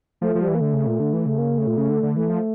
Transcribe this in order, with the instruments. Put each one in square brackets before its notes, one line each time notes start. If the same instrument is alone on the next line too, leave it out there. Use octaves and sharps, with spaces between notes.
[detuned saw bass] F3 [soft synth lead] A3
[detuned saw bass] F3
[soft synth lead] G3
[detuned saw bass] E3
[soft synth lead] A#3
[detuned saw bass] D3 [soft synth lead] A3
[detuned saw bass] C#3
A#2
D3
E3
[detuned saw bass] C#3 [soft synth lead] A3
[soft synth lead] A#3
A3
[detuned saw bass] A#2
C#3
D3
D3
[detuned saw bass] E3 [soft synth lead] A3
[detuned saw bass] F3